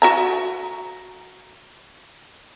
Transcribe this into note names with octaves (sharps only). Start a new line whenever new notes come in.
F#4 E5 A#5